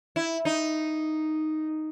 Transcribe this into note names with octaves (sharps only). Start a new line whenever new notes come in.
E4
D#4